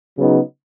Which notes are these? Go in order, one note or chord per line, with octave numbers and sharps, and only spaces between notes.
C#3 F#3 B3 D#4